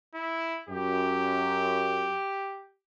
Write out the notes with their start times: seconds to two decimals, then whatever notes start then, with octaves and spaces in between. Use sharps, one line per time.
0.15 E4
0.69 F#2 G4